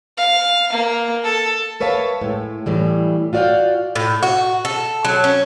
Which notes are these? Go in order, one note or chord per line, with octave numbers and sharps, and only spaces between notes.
F5
A#3
A4
A#4 B4 C#5 E5 F5 A5
A2 G#3
A2 E3 G3
F4 F#4 D5 E5 F5 G5
A2
F#4
A4
F#3
C#4